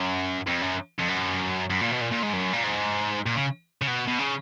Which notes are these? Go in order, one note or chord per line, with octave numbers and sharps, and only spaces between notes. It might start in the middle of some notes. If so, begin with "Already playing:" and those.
Already playing: F#2
F2
F#2
F2
F#2
F#2
A#2
B2
A#2
A#2
G#2
F#2
A#2
G#2
A#2
C#3
C#3
B2
B2
C#3